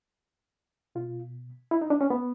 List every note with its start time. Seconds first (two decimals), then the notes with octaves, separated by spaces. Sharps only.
0.95 B2 F4
1.71 E4
1.81 D#4
1.90 D4
2.01 C#4
2.10 B3